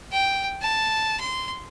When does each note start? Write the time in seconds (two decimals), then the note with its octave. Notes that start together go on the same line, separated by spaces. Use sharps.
0.12 G5
0.62 A5
1.20 C6